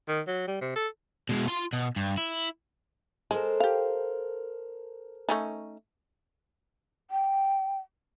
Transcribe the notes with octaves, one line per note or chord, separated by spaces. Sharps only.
D#3
F#3
G3
C3
A4
B2 G#3
F4 C6
B2
G2
E4
G#3 A4 A#4 C5
G4 F5
A3 C#4 D#4
G5